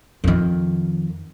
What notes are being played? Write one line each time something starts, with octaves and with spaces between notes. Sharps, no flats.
F2 D#3